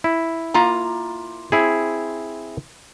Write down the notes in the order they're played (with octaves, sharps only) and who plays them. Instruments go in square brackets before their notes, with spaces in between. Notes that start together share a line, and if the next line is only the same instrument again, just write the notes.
[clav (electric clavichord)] E4
[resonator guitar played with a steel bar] A#3 F4 A#5
[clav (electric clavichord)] C4 E4 G#4